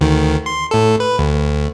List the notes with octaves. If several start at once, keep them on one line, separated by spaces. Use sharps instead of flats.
D2 D#3
C6
A2 A4
B4
D2